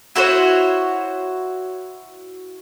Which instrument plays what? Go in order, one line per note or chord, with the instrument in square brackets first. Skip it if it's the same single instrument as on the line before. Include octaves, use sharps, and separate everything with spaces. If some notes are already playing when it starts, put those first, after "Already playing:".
[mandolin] E4 F#4 C5 C#5